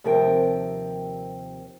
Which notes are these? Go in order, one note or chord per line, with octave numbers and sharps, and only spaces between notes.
D#2 C3 F3 C4 A#4 G5